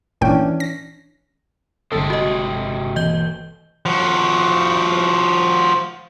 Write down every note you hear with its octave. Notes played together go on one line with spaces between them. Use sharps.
G#1 A#2 E3 C#4 D4 G5
A#6
G1 C3 G#3 A4
F#4 D#5
B2 E3 A#3 D#5 G6 G7
F3 F#4